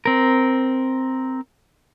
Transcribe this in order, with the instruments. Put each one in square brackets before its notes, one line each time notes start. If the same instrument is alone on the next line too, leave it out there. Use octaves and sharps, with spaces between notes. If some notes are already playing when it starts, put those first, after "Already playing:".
[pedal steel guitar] C4 A#4